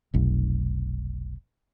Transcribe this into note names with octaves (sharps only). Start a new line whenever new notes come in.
F1 B1